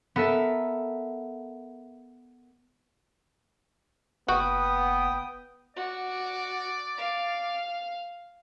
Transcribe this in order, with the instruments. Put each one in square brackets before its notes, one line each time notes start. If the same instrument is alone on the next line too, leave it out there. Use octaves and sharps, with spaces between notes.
[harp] B3 A4 A#4 E5
[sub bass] F#1 [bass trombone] B3 [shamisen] F#4 [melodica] G5 D#6
[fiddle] F#4 [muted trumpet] D5
[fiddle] F5